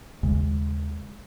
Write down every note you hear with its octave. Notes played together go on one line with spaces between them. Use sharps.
D#2 C#3 G#3